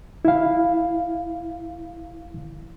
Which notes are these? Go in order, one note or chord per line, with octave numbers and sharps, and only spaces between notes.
E4 F5